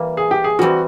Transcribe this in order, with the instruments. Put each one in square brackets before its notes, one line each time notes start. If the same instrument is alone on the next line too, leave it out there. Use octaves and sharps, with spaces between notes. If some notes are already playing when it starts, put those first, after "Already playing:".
Already playing: [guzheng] E3 G3 A#3
[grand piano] G#4
G4
G#4
[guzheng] E3 G3 C4 [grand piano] F#4